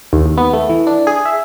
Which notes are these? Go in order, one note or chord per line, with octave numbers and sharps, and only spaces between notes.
D#2
D#2
B3
A3
E3
D4
G#4
E5